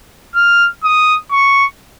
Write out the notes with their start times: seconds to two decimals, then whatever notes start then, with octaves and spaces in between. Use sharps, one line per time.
0.35 F6
0.84 D#6
1.31 C#6